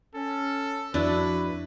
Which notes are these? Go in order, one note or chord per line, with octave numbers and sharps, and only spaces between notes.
C#4 A4
F2 D4 E4 F#4 B4